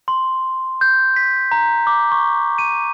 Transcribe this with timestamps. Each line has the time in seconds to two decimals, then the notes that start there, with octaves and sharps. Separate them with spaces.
0.08 C6
0.81 G6
1.16 B6
1.52 A#5
1.87 D6
2.12 C#6
2.58 D#7